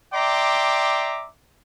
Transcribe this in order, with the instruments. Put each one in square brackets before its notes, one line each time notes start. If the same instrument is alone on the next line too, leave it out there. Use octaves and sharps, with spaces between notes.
[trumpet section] D5 E5 G5 A#5 C6 D6